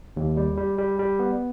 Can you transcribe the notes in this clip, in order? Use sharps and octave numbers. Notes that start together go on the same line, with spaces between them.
D#2
G3
G3
G3
G3
B3